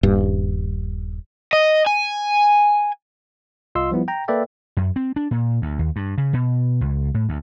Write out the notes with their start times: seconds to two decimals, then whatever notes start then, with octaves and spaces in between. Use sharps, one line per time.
0.03 D#1 G2
1.53 D#5
1.87 G#5
3.75 C2 F4 D#5 C6 E6
3.91 F3 G3 B3 E4
4.08 G5 A#5
4.28 A#3 A4 B4 D5 E5 G5
4.77 F#2
4.96 C4
5.16 D4
5.31 A#2
5.62 D2
5.79 D#2
5.96 G2
6.18 C#3
6.33 B2
6.81 C#2
7.14 A2
7.29 D2